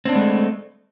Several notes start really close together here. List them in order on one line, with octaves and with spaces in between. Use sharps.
C4 D4 B3 G#3 A3